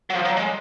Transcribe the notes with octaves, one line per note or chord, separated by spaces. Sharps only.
F#3
F3
F#3
G#3